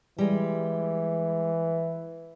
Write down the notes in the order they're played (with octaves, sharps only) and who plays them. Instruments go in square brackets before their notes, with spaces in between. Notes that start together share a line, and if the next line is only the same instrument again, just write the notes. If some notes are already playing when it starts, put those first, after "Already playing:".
[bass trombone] E3 [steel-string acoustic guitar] G3 G#3